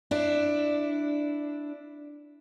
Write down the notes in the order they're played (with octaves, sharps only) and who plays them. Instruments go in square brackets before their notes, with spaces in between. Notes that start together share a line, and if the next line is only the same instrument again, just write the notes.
[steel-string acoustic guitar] D4 E4